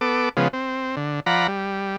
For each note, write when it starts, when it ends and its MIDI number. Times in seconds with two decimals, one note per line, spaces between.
0.01 0.29 59
0.01 0.29 69
0.01 0.29 86
0.37 0.48 49
0.37 0.48 53
0.37 0.48 56
0.37 0.48 59
0.53 0.96 60
0.97 1.20 50
1.26 1.47 53
1.26 1.47 74
1.26 1.47 78
1.26 1.47 82
1.26 1.47 83
1.48 1.96 55